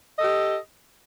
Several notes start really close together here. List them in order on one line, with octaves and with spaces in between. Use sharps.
D#5 A4 G4